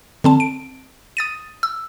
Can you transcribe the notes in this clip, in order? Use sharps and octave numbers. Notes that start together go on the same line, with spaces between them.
D3 C4 A5
D7
D#6 A6 D#7
E6